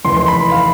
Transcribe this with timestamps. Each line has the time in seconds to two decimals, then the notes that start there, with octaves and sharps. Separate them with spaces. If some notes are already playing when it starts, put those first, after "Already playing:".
0.05 F1 D#2 C#3 E3 C6
0.17 C6
0.28 B5
0.52 F5